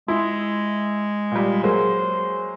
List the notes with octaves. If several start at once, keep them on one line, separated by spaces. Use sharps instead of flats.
G#3 E4
A#2 G3
F#3 G#3 A#3 C5